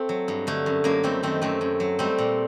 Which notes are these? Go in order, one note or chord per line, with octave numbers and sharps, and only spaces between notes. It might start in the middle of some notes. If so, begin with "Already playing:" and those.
Already playing: A3 C4
F#3
G2
D3 A3
F#2
F#2 A#3
G3 A3 C4
D#3 A3 C4
F#2 A3 C4
F#2
F#3
G3 A3 C4
A#2